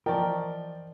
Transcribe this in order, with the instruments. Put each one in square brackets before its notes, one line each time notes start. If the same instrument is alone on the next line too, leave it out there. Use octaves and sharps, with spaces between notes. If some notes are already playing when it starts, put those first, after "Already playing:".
[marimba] E3 D#5 C#6 [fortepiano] F3 D5 [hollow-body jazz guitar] A#4 [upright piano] G5